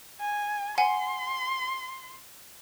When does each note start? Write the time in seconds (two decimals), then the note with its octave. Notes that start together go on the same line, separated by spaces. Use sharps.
0.21 G#5
0.78 F#5 G#5 C6